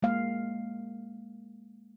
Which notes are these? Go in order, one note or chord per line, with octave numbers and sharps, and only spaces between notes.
G#3 A#3 F5